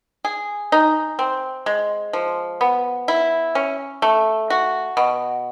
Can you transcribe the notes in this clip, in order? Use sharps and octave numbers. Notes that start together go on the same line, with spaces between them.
G#4
D#4
C4
G#3
F3
B3
E4
C#4
A3
F#4
B2